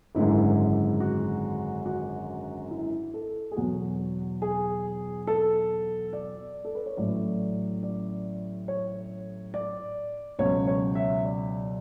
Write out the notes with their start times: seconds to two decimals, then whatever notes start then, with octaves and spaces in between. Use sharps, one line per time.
0.15 G#1 F#2 D3 G#3 E4
1.00 F#4
1.86 F#4
2.71 E4
3.14 A4
3.52 G#4
3.56 E2 B2 F#3 F#4
4.42 G#4
5.27 A4
6.13 D5
6.65 A4
6.75 B4
6.86 C#5
6.97 A1 A2 F#3 D5
7.83 D5
8.68 C#5
9.54 D5
10.39 C#2 B2 F#3 C#5
10.67 C#5
10.95 E5
11.25 D5